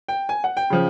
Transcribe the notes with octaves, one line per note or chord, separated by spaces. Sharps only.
G5
G#5
F#5
G5
C#3 F3